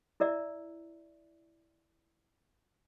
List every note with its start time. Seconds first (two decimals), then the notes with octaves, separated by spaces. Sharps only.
0.20 E4 A#4 D5 E5